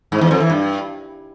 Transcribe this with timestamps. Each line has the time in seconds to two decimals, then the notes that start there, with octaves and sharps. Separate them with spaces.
0.12 G#2
0.21 E2
0.31 F2
0.40 E3
0.50 G2